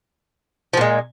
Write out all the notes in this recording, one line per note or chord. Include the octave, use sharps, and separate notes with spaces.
A#2 F3 G#3